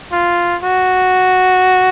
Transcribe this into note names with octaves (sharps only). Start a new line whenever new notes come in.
F4
F#4